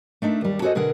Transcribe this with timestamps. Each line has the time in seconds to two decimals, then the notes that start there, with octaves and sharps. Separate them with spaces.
0.22 A3 D4 D#4 E5
0.41 D#2 G3
0.62 F#4 G#4 A4 C5 D5 D#5
0.75 B2 D3 G#4 A#4 F#5